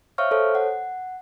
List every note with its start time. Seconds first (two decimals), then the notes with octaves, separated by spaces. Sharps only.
0.18 C5 C#5 E5 F5 C#6 F6
0.31 A4 C5 C#5
0.55 F#5